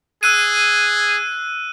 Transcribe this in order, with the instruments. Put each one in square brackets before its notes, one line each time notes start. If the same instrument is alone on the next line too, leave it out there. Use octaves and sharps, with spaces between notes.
[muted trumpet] G#4 [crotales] E6 F#6 D#7